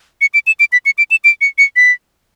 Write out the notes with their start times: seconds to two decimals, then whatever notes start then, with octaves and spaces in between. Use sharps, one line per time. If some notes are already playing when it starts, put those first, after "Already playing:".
0.21 C#7
0.34 D7
0.47 E7
0.60 D7
0.72 B6
0.86 C#7
0.98 D7
1.11 E7
1.24 D7
1.41 C#7
1.58 C#7
1.76 B6